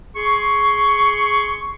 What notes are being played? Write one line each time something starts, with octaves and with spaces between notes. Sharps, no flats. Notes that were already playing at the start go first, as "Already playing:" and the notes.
G#4 C6 C#6